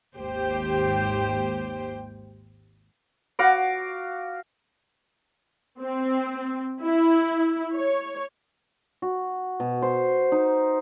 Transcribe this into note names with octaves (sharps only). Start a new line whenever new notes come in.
G#1 D#2 G4 C5 G5
F#4 F5 D6
C4
E4
C#5
F#4
B2
C5
D#4